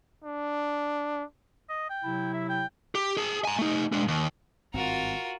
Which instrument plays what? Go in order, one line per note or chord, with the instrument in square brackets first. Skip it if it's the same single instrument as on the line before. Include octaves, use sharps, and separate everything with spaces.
[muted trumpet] D4
[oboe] D#5
G5
[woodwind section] C3 F#3 E4
[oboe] E5
G5
[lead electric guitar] G4
G#4 A5
G#5 A#5
A3 D#4
G#3 D4
D#2
[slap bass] G#1 G2 C4 [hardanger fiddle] F4 A#4 [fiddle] F#4